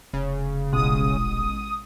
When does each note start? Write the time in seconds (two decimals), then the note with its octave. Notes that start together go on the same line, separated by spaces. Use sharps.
0.13 F1 C#3
0.73 D#1 A1 B2 G#3 D#6